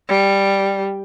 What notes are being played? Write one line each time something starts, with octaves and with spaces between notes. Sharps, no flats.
G3